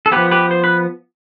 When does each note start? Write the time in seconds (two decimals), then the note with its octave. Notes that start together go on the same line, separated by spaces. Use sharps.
0.06 A4
0.12 F3 B3 G4 B4
0.31 G4 B4
0.51 C5
0.64 B4